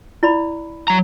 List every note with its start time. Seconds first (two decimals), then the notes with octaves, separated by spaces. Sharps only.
0.23 E4 D5 B5
0.88 F#3 A#5